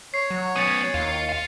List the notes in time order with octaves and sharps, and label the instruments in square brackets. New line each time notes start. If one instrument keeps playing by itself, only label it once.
[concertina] C#5 [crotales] C7
[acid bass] F#3
[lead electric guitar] B3 C#4 [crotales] A6 C#7 D#7
[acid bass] D#2 [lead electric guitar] F4
[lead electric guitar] F4 F5